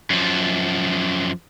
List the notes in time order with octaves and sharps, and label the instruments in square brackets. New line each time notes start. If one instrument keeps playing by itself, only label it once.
[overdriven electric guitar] F#2 F3